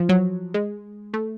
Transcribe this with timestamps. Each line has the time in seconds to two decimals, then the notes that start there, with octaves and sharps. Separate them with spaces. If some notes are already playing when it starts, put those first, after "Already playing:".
Already playing: F3
0.09 F#3
0.54 G#3
1.14 A3